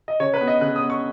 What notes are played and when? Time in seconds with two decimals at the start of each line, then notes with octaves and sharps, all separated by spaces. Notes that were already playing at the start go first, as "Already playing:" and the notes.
0.08 D#5
0.20 C#3 C#5
0.34 B4
0.41 B3
0.48 D#5
0.61 C#3 F#6
0.76 D#6
0.83 B3
0.90 C#6